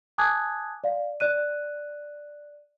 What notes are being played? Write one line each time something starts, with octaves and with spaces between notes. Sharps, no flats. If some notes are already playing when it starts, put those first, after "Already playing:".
G#5 A5 D6 D#6 F#6 G#6
D5 F5
D5 F#6 D#7